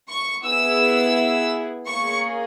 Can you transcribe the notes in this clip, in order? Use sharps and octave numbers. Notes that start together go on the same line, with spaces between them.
C#6
B3 E4 G#4 E6
A#3 C#4 G#4 C#6